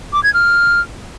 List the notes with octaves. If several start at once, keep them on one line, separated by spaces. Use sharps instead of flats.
D6
G#6
F6